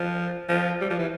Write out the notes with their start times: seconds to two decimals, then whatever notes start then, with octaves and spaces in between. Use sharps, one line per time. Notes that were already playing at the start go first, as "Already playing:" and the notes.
Already playing: F3
0.49 F3
0.81 G3
0.90 F3
0.98 E3